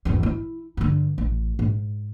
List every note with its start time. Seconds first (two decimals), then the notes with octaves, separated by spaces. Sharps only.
0.05 G#1 E2
0.23 E4
0.77 G2 D3
1.18 A1
1.59 G#2